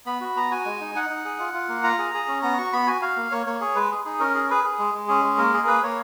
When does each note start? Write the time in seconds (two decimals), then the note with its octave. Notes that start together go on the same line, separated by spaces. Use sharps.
0.06 B3 B5
0.21 F#4
0.36 B3 A#5
0.51 F#4 G#5
0.65 G#3
0.81 D#4
0.95 D#4 F#5
1.10 D#4
1.25 G#4
1.40 F4
1.54 F4
1.69 A#3
1.83 F4 A#5
1.99 G#4
2.14 G#4
2.28 C#4
2.42 B3 A#5
2.58 F#4 C#6
2.73 B3 B5
2.87 F#4 G#5
3.01 F#4 F5
3.16 A#3
3.31 A#3 C#5
3.46 A#3 C#5
3.61 G#4 C#5
3.75 G#3 B4
3.91 G#4
4.05 D#4 G#4
4.20 C#4 A#4
4.35 G#4
4.50 G#4 B4
4.64 G#4
4.79 G#3
4.94 G#3
5.08 C#4 G#4
5.24 G#3
5.38 A#3 A#4
5.54 G#4
5.67 A#3 B4
5.83 A#3 C#5